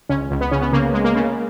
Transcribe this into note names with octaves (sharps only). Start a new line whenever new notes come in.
C#2 C#4
C#2
B3
C#3 C#4
B3
C#3 A#3
G#3
A#3
C#3